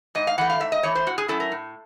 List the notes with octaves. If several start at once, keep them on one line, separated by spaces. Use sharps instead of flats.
G#2 D#5
F5
E3 A3 F#5
F5
G#2 E5
D#5
E3 A3 C#5
C5
A2 F#4
G#4
F#3 A3 C#4 E4 A4
A#4
A2